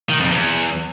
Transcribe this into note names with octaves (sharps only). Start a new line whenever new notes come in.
D#3
F2
E2